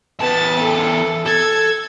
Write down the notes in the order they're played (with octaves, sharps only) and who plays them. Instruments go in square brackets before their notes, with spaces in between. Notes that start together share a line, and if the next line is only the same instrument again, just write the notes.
[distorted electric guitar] E2 A5 [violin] B3 A6
[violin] A4
[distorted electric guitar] A4 [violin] G#6